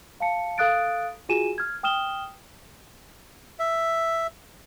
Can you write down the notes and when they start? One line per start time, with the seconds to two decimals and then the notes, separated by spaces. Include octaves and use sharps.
0.20 F5 A5 C#7
0.58 A4 F5 D#6 F#6 A6 D7
1.29 F4 F#4 G#4 G#5 D#7 E7
1.58 F6 G#6
1.83 G5 D#6 F6 E7 G7
3.59 E5